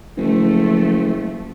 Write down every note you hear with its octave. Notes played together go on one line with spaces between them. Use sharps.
F#1 F3 A3